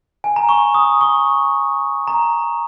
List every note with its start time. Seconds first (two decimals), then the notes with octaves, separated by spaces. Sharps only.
0.24 G#5
0.36 A#5
0.49 C#6
0.74 D#6
1.01 C#6
2.07 A#5